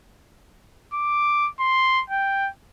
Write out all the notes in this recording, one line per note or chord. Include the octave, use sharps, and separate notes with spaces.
D6
C6
G5